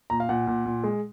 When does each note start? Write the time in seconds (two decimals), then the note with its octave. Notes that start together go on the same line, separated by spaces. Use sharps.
0.10 A#2 A#5
0.20 F5
0.29 A#2 F#5
0.47 A#2
0.66 A#2
0.84 G#3